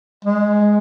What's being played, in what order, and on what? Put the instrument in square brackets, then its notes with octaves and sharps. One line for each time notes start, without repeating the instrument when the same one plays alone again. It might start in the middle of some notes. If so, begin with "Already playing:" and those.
[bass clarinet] G#3